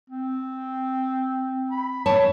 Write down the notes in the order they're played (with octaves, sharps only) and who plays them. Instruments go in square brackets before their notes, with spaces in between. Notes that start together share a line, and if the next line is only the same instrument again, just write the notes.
[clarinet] C4
B5
[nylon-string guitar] C#5 A5